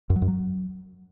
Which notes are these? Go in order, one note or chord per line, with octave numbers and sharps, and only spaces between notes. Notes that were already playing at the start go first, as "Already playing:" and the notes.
F#2
F#3
F#2
F#3